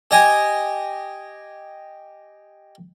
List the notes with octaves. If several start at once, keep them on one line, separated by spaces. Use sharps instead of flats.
G4 D#5 G#5